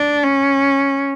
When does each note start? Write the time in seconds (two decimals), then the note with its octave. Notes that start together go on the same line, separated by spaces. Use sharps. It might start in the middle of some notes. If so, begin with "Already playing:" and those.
Already playing: D4
0.23 C#4